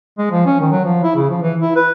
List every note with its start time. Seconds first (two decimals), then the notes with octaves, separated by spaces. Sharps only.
0.18 G#3
0.31 F3
0.46 C#4
0.60 D#3
0.71 F#3
0.85 F3
1.04 E4
1.16 C#3
1.30 F3
1.42 E3
1.60 E4
1.76 B4